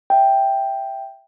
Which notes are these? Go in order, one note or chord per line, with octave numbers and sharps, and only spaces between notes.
E5 G5